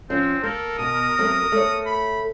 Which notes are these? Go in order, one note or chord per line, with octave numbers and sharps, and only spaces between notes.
F3 C4 C#4
A#3 A4 A#4
B2 D#6
F#3 A3 C4
A3 C#5
B5